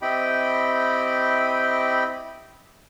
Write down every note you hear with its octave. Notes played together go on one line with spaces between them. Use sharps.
C4 E4 G4 D#5 G5 B5